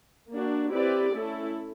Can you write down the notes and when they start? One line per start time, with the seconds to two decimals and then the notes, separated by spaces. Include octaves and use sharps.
0.32 A#3 D4 F#4
0.73 C4 E4 G4 B4 D5
1.14 A3 C#4 E4 A4